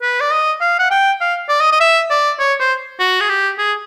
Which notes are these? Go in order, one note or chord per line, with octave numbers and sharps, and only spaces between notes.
B4
D5
D#5
F5
F#5
G5
F5
D5
D#5
D#5
E5
D5
C#5
C5
F#4
G#4
G4
G#4